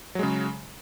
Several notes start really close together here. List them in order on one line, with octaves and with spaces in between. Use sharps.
F#3 G#3 C#3